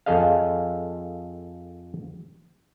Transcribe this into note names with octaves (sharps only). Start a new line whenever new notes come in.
F2 G#4 A4 D#5 F5